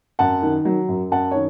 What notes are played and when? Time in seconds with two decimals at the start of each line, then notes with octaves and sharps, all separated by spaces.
0.19 F#2 F#5 A5
0.42 D#3
0.65 F#3
0.89 F#2
1.11 F#2 F#5 A5
1.31 D#3 C#5